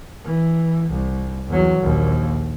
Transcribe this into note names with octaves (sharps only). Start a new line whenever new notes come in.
E3
C2
E2 F#3
A#1 D#2